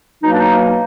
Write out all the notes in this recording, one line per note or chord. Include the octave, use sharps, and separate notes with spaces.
B2 F#3 A#3 D#4
D4
D#4